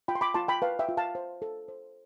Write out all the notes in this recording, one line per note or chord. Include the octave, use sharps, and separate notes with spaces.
F4 G5 B5
C6
B5 D6
F4 A5 C6
G5 B5
B4 F5 A5
E5 G5
F4
F5 A5
C5
A4
C5